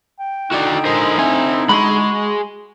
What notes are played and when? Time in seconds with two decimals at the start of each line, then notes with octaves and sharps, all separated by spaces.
0.20 G5
0.51 D3 D#4 E4 F#4 D5
0.85 G#3 A#4 C5
1.18 C4 E5 G#5
1.69 G#3 F#4 B5 C6